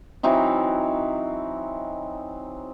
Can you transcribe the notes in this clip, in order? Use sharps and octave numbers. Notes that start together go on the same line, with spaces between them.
E3 F#3 C4 D#4